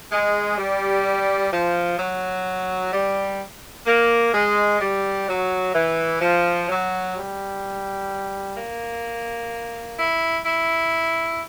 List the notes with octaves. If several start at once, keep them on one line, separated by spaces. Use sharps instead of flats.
G#3
G3
F3
F#3
G3
A#3
G#3
G3
F#3
E3
F3
F#3
G3
A#3
E4
E4